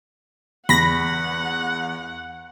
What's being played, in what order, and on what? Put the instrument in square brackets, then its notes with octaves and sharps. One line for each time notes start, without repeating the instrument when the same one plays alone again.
[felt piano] E2 [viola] F#5 [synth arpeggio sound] B5 A#6